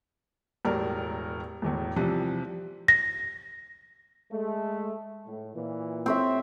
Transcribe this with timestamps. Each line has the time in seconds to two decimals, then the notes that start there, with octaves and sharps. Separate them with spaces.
0.65 E1 A2 G3 A#4 D5
1.62 E1 E2 A2
1.96 C3 E3 F3 G3
2.88 A#6
4.30 G#3 A3
5.26 A2
5.55 A#2 E3
6.06 C4 C#5 E5